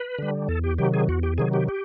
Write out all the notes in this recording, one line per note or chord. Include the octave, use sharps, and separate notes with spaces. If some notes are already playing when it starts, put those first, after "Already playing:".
Already playing: B4
D3 G3
E2 A4
G4
C3 D#3 F#3 G4
G#4
E2 F#4
G4
C3 D#3 F#3 G#4
G4
G4